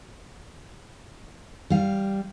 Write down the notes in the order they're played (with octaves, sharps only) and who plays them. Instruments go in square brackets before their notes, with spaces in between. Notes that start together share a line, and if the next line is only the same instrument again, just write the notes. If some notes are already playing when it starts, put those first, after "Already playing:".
[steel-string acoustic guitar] G3 F5